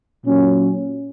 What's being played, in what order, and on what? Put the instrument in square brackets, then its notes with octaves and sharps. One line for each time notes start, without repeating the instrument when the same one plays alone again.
[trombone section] A#2 F#3 C#4